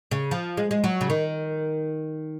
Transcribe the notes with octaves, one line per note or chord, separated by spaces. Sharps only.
C#3
F3
G#3
G#3
F#3
C#3
D#3